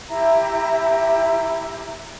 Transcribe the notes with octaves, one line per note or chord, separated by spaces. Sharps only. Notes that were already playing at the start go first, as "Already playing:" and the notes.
E4 G4 E5 A#5